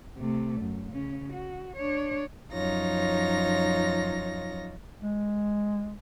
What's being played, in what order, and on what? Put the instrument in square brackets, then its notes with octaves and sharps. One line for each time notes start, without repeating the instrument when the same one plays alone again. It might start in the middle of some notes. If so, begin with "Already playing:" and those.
[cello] C3 A3
F#2
C#3 C#4
F#4
D4 C#5
[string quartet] F#2 F3 D#4 F4 C#5 A#6
[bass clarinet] G#3